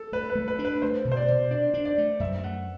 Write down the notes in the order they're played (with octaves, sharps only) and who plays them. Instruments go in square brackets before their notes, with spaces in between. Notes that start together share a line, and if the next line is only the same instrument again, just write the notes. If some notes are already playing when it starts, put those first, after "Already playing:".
Already playing: [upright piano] A4
[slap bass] A3 [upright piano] B4
[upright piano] B4
[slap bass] A3
[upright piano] B4
[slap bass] D4
[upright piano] B4
[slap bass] A3 [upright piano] C5
[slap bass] B2
[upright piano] C5
D5
[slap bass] B2
[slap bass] D4 [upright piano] D5
[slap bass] D4
[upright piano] D5
[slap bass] A3
[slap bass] F#2 [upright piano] E5
[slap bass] A3 [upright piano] F#5